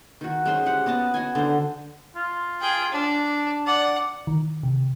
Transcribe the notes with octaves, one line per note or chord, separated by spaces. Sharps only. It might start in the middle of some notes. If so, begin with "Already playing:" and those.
D#3 F#4
G#3 C#4 C5 C6
G4 F#5
B3 F#4 D#5 A5
F#4 D#5 G#5
D3 C5
F4
G#4 G5
D4
D5 F#5
D#3
C3